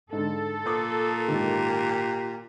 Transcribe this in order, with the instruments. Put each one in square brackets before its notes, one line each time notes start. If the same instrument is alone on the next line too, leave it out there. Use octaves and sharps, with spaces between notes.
[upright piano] G#2 D3 [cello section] A4
[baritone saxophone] A#2 [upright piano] D6 D#6 A6
[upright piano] G#2 D#3 [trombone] G4